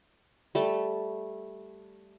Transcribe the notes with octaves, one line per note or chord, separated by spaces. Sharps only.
G3 A3